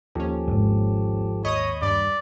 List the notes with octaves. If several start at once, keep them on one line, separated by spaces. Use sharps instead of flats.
D#2 F3 C#4 G4 A4
D#1 G#1
D#2 C#5 D#5 B5 D#6 G6
G2 D5